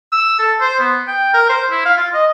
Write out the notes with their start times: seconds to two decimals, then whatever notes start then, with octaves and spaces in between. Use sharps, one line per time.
0.12 E6
0.39 A4
0.60 C5
0.80 B3
1.08 G5
1.34 A#4
1.49 C5
1.71 E4
1.85 F5
1.97 F4
2.14 D#5